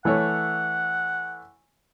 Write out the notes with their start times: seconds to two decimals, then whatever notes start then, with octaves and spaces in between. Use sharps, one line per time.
0.05 E3 A3 C#5 F#5